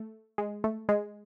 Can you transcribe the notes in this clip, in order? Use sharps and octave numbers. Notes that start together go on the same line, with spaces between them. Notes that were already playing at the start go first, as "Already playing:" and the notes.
Already playing: A3
G#3
A3
G#3